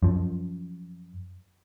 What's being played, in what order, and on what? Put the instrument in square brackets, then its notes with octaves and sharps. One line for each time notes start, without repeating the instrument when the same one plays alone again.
[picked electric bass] F#2 F3